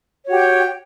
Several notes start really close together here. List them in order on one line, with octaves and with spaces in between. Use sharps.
C#5 F#4 G4 G5